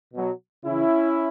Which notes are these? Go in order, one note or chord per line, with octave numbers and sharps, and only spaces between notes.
B2 F#3
C#3 E3 C#4 E4